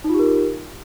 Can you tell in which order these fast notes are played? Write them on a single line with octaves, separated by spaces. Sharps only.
D#4 F4 G4 A#4